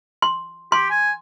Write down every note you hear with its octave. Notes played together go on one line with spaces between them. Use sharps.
C6
G4 C6
G#5